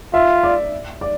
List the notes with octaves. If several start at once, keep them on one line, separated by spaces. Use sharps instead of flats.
F4 E5
D5
D5